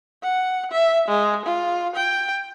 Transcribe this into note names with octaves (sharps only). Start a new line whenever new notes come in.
F#5
E5
G#3
F4
G5